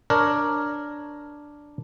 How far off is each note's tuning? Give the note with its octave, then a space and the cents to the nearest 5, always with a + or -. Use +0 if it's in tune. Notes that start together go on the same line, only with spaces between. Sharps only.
D4 +0 A#4 +0 C#5 +0